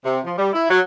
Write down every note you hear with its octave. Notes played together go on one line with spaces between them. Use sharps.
C3
F3
G3
E4
F#3